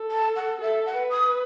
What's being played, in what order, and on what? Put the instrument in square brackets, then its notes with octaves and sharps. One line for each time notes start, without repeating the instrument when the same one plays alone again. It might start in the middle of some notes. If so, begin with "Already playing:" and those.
Already playing: [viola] A4
[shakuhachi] A5
F#5
[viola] A4 [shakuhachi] E5
[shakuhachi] F#5
[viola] B4
[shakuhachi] D#6